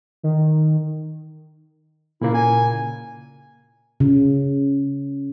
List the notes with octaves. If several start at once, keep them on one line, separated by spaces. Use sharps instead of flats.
D#3
A#2 C#3 A#3 E4
G#5
C#3